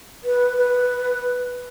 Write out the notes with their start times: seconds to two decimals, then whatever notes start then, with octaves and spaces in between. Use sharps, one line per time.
0.24 B4
0.57 B4